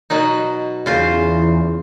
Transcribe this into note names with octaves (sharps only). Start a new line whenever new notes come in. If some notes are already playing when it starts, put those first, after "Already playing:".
B2 F#3 D#4
E2 C#3 F4 C5